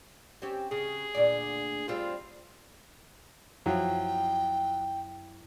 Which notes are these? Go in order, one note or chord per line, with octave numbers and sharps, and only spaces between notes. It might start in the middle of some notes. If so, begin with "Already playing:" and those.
C4 C#4 G4
C#3 G#4
D2 A#2 D5
G3 C4 F4 C5
F#2 F3 F#3 E4 G5